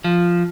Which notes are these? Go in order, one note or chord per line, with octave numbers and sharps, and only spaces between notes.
F3